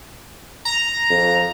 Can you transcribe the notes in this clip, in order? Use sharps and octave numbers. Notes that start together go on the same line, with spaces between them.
A#5
F2